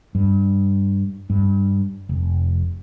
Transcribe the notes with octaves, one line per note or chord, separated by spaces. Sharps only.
G2
G2
F1